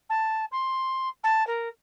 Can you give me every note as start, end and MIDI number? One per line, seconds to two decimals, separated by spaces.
0.09 0.45 81
0.51 1.08 84
1.23 1.46 81
1.47 1.68 70